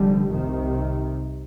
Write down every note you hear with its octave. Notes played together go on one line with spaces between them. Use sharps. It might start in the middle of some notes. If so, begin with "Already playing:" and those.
Already playing: F1 F2 D3 G3
C2 C3 D#3